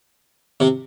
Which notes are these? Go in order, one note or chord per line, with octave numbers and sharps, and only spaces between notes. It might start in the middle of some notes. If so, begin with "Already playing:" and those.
C3